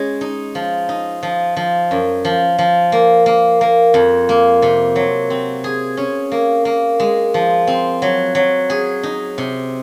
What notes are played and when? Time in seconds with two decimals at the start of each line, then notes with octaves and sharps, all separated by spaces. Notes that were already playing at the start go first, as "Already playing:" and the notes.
Already playing: G#3 C#4 G#4
0.21 D#4
0.55 F3
0.89 D#4
1.23 F3
1.56 F3
1.91 F#2
2.25 F3
2.58 F3
2.92 A#3
3.26 A#3
3.61 A#3
3.94 F2
4.29 A#3
4.62 C3
4.96 F#3
5.30 C4
5.64 G#4
5.97 C#4
6.31 A#3
6.65 A#3
7.00 G#3
7.34 F3
7.67 C4
8.02 F#3
8.35 F#3
8.70 G#4
9.03 D#4
9.38 C3